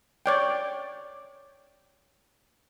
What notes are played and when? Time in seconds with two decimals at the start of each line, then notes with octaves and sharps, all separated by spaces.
0.26 C#5 D5 G5